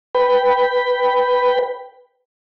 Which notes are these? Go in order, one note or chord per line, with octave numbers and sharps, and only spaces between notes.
B4 G5 B5